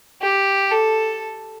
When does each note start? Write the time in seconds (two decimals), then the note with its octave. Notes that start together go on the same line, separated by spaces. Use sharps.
0.22 G4
0.71 A4